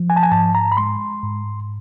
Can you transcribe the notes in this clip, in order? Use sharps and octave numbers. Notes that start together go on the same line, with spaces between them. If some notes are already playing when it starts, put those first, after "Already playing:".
Already playing: F3
G#5
A5
G#5
G#2 A5
A#5
B5
G#3 C6
G#2